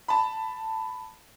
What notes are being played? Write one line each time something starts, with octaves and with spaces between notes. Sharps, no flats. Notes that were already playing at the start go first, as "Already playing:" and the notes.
A5 B5